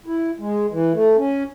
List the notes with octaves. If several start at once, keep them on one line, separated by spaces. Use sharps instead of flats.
E4
G#3
E3
A3
C#4